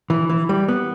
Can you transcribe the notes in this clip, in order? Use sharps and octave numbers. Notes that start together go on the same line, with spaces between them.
E3
E3
G3
B3